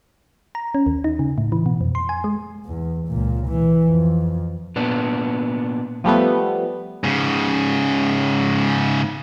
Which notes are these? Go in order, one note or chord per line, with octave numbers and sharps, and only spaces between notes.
A#5
C#4
D#2
D#4
C#3
A2
E3
B2
F2
C6
G#5
G#3
E2
C#2 A#2
E3
F2
A#2 B3 D4
F3 G3 A3 B3
G#2 C#3